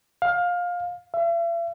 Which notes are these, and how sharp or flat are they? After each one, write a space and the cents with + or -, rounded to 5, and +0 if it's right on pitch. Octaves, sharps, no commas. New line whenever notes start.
F5 +20
E5 +45